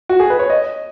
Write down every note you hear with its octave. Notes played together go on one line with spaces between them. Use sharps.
F#4
G#4
B4
C#5
D#5